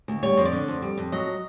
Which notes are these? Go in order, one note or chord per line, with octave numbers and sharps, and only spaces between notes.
D2
G3 C#5
F2
D5
D3
F2
G3
F2
F#3 D#5